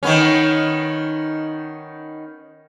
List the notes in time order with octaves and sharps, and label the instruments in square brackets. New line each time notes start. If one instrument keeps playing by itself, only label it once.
[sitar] D#3 B3 C#4